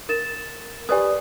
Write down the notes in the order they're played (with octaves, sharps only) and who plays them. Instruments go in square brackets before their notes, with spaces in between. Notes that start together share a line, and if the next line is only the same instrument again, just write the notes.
[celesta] A#4 A6 E7
[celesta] G4 D#6 [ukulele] B4 D5 G#5